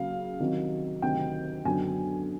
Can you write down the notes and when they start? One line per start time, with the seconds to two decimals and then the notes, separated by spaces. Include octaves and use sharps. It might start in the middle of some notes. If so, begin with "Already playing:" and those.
Already playing: C#3 F#3 A#3 F5
0.39 C2 C3 D#3 F#3
1.02 D2 C3 D#3 F#3 G5
1.65 F#2 D3 F#3 B3 D4 G#5